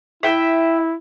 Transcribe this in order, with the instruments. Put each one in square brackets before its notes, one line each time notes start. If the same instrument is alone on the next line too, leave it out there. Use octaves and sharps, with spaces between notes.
[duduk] E4 [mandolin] E5 G5